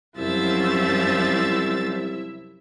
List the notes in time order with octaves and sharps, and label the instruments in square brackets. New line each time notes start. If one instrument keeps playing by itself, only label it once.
[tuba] C2 [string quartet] F#2 F3 A6 [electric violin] E4 E5